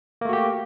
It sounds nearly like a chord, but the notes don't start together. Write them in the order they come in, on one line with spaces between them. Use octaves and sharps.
A#3 A3 F#4 G4